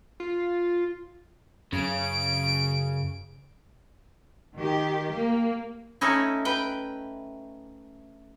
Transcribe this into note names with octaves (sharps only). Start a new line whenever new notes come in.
F4
F#2 C#3 D7
D#3 G4
A#3
A3 C#4 D#4 E4
B4 G5